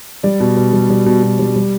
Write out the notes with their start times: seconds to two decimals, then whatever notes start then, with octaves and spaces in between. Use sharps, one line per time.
0.23 G3 D5
0.40 B2
0.56 B2
0.73 G3
0.90 G3
1.06 B2
1.23 B2
1.39 G3
1.56 G3